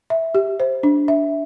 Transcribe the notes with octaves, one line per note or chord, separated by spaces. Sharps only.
E5
G4
C5
D4
E5